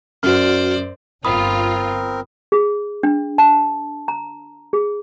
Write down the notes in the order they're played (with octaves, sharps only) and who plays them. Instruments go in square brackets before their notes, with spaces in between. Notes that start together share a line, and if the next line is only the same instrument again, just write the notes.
[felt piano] F#2 [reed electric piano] F#4 F6 [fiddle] C5 D5
[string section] G1 F4 [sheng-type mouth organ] C4 A#4 [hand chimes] B5 D#6
[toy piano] G#4
D4
A5
A#5
G#4